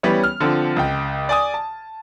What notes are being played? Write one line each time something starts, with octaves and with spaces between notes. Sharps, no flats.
E3 G3 B3 C#4 C#5
F6
D3 F3 C4
C#2 G5
D5 G#5 D#6
A5